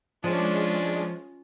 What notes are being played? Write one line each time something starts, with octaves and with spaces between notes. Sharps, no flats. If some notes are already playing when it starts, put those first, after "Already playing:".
F3 G#3 C#4 D4 F4